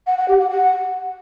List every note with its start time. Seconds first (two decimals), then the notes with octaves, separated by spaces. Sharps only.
0.07 F#5
0.18 F#5
0.28 G4
0.39 F#5
0.50 F#5